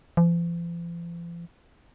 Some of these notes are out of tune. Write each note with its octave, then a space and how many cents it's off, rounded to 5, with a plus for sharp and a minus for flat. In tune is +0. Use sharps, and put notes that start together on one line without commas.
F3 -45